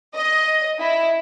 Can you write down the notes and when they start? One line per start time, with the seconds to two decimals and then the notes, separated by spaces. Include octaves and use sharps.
0.15 D#5
0.81 E4